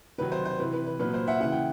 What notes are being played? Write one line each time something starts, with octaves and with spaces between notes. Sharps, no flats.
C3 D#3 F#3 B4
C5
C5
C3 E3 B4
B4
B4
A#2 F#3 B4
C5
E5 F#5
C#3 E3 F#5
G5